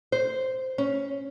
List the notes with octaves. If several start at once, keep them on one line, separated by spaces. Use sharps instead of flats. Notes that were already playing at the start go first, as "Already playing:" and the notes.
C5
C#4